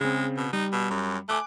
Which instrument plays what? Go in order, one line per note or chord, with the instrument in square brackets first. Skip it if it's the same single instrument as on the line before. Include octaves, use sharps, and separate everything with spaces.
[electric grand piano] C#3 C4 [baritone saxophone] G#3
[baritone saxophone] B2
[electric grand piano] G3 [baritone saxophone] D#4
[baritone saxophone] B2
F#2
[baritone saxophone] A3 [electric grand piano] G#5 D6 F#6